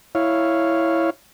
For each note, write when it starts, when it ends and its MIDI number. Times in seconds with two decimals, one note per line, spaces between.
0.15 1.10 64
0.15 1.10 73
0.15 1.10 77